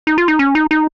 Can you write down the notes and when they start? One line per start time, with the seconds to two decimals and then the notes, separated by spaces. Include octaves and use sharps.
0.07 D#4
0.18 F4
0.28 D#4
0.39 C#4
0.55 D#4
0.71 D#4